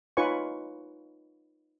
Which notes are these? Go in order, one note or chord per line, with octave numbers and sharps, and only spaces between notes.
D#4 F4 B4 C#5 G#5 C#6